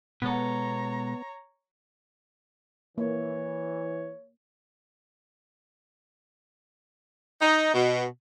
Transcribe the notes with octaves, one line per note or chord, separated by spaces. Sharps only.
B2 G#3 B3 A4 C#5 A#5
E3 A#3 C#5
D#4
B2